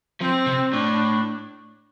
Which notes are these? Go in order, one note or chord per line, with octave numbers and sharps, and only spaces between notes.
F3 C4
C3
A2 D4